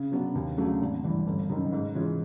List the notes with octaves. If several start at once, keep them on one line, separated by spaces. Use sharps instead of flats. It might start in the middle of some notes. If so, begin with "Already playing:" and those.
Already playing: C#3
F#3 B3 D4
D#2
C#3 F#3 A3 D4
G#1
G2 E3
G1
F#2 D#3
G#2
E3 G#3 C#4 F4